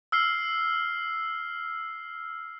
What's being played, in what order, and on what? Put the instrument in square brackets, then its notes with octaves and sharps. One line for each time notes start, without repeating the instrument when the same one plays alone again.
[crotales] E6 F6 C7